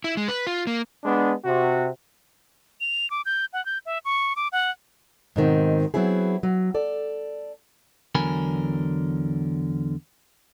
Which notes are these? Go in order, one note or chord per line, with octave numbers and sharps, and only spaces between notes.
E4
G#3
B4
F4
A#3
G#3 B3 D4
C3 F#4
F7
D6
G6
F#5
G6
E5
C#6
D6
F#5
G#2 B2 D#3 C4
F#3 B3 C4 E4 G#4
F#3
A4 D5
E2 D3 F#3 A#4 G#5 B5